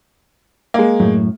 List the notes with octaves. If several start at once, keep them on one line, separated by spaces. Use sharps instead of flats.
G#3 A#3
F#2 A2